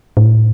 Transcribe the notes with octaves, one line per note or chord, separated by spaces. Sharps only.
A2